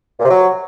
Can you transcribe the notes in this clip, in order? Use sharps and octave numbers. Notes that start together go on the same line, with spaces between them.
A#2
C3
F#3